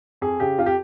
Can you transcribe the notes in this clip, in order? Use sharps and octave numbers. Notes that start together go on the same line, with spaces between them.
F2 G#4
C#3 G4
F2 F4
G4